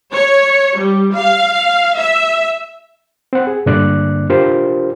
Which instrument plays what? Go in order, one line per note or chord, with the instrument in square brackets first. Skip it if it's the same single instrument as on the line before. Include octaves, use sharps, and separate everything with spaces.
[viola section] C#5
G3
F5
E5
[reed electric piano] C4 F#5
G#4
G2 D3 A#3 D4 D5 F#6
D4 F4 G4 A#4 C5